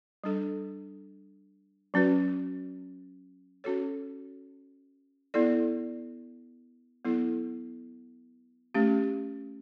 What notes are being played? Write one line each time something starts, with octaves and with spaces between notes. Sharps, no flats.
G3 D4 A4
F#3 C#4 F#4 B4
C#4 F#4 A4 C#5
B3 E4 A4 D5
F#3 B3 E4 A4
A3 C#4 G4